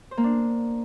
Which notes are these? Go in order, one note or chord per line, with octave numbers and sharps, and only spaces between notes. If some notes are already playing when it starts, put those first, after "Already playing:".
C5
A#3
D4